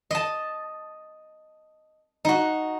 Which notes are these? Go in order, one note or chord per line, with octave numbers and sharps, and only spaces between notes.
D#5 A5
D#4 F#4